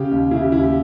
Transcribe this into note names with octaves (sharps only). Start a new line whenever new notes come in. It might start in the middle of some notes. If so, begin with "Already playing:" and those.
Already playing: C#3 G4
D#2
C#3 E4
G4
D#2 E4
G4